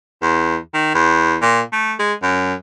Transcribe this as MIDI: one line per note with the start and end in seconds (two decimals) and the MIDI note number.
0.22 0.57 40
0.74 0.93 51
0.94 1.36 40
1.42 1.61 46
1.72 1.93 57
1.99 2.13 56
2.23 2.54 42